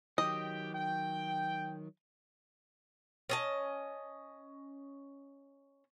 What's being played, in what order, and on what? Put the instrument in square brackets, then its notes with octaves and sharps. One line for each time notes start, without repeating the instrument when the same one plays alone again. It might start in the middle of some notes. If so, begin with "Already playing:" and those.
[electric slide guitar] D#3 F#3 [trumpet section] G4 G5 [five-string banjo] D#5
[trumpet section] G5
[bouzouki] C#4 D#5 A5